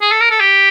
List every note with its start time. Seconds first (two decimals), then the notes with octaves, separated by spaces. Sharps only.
0.01 G#4
0.11 A4
0.21 A#4
0.30 A4
0.40 G4